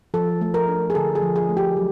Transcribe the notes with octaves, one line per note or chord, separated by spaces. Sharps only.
F3 A4
A3
A#4
D4
G#4
D3 A4
G#4
F3
G#4
A3
G4
F#3